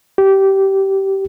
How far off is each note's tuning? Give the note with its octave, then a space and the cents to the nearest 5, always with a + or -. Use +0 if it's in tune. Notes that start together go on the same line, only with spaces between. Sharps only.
G4 -20